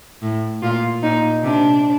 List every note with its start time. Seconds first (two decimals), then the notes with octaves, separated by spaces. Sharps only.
0.22 A2
0.62 A#2 F4
1.03 A#2 D#4
1.44 C3 D4